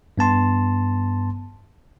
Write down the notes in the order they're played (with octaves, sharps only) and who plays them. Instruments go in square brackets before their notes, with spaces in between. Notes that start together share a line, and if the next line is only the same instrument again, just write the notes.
[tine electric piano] G2 B3 A5 C6